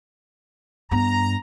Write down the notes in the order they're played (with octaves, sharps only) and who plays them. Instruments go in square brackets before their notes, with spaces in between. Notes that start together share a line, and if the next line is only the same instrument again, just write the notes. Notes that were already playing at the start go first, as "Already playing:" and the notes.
[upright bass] G2 B3 [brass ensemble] A#5